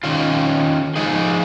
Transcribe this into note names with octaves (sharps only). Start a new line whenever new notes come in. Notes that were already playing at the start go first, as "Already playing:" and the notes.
D#3 C#4 F4
F3 G#3 D#4 G#4